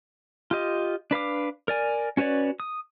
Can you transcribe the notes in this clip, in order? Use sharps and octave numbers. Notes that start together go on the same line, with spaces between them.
F4 G4 D#5
D4 B4 F5 D6
A#4 D5 G#5
C#4 F#4 B4 C#5 D5
D#6